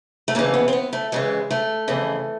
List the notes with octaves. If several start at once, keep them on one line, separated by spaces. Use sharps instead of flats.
A3
F2 C#3 E3 A#3
B3
C4
B3
A3
F2 C#3 E3 G#3
A3
F2 C#3 E3